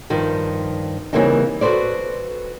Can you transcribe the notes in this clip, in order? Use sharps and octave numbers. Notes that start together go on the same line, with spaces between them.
G2 D#3 F3
C#3 E3 G3 A#3 C4 D#4
F#4 A4 B4 C5 D5